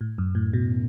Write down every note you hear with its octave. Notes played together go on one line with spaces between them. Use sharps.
A2
F#2
A2
B2